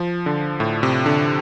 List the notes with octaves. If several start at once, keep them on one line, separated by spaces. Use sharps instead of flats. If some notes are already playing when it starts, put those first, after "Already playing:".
Already playing: F3
D3
A2
C3
D3